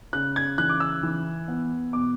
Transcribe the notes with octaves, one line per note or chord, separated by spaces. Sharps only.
C#3 F#6
G#6
E3 F#6
D6
E6
E3
B3
B2 D6